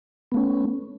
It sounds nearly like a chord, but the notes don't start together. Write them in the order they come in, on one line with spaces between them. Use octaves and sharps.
B3 A3 C#4